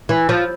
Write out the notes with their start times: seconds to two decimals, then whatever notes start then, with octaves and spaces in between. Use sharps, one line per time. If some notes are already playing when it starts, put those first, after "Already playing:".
0.09 E3
0.29 F3